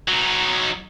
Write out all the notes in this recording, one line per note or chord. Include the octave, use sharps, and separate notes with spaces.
F#3 D#4